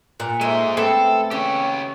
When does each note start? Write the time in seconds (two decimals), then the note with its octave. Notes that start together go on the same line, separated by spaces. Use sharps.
0.20 A#2 F#5
0.41 G#3 A3 C5 E5 G#5
0.77 A3 B3 C4 A4
1.31 C#3 G4 C#5